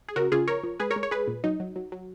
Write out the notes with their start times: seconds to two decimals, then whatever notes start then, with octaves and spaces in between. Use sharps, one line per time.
0.08 G#4
0.16 C#3 F#4 A#4
0.32 C#3 F4 G#4
0.48 F3 A#4 C#5
0.63 F3
0.80 G#3 G#4 B4
0.91 A#4 C#5
0.96 G#3
1.03 C#5
1.11 G#3 G#4 B4
1.27 A#2
1.44 F#3 D#4
1.60 F#3
1.76 F#3
1.92 F#3